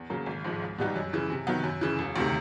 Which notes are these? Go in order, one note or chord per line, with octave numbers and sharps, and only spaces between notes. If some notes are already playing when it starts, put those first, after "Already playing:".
Already playing: E2
C#3 F#3 A#3
G#1
G#2 F3 G#3
C#2
B2 G3 B3 D#4
F#2
C#3 E3
C3
D#3 F#3 B3
F#2
C#3 E3
E1
D2 C3 D#3